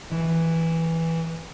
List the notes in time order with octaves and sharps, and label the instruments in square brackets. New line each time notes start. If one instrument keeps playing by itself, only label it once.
[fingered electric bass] E3